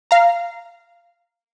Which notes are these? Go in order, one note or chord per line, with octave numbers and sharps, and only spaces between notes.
F5 A#5